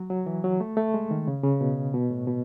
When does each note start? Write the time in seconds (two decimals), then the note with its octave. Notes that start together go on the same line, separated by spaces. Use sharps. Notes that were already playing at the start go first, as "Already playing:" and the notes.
Already playing: F#3
0.10 F#3
0.26 E3
0.44 F#3
0.60 A3
0.77 A3
0.94 G#3
1.11 D#3
1.27 C#3
1.44 C#3
1.61 B2
1.94 B2
2.10 A2
2.27 B2